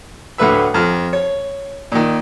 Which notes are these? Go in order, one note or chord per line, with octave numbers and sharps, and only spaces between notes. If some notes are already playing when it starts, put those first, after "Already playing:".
D2 A2 D3 B4 E5
F2 F6
C#5
A#2 D#3